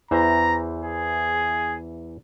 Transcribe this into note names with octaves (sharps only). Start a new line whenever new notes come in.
E2 E3 C5 A#5
G#4